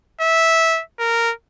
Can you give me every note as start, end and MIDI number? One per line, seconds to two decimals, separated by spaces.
0.21 0.82 76
0.99 1.32 70